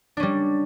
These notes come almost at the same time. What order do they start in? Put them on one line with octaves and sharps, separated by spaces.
D4 C#4 G3